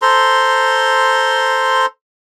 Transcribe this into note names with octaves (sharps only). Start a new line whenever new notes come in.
A4 C5 A#5 C6